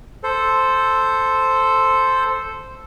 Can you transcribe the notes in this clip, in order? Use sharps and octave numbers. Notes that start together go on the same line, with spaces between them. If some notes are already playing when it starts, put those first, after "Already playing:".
A4 C5